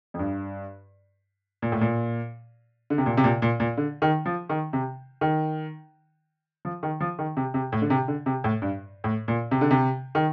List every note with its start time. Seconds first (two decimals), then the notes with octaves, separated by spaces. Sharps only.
0.14 F2
0.19 G2
1.62 A#2
1.72 A2
1.81 A#2
2.90 D3
2.98 C3
3.06 A#2
3.17 C3
3.24 A#2
3.42 A#2
3.60 A#2
3.77 D3
4.02 D#3
4.26 F3
4.49 D#3
4.73 C3
5.21 D#3
6.65 F3
6.83 D#3
7.00 F3
7.19 D#3
7.37 C3
7.54 C3
7.72 A2
7.82 D3
7.90 C3
8.08 D3
8.26 C3
8.44 A2
8.62 G2
9.04 A2
9.28 A#2
9.51 C3
9.61 D3
9.71 C3
10.15 D#3